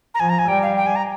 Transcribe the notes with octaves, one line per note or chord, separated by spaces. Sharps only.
A#5
F3 G#5
A#5
G#5
G3 G5
F5
G5
G#5
A#5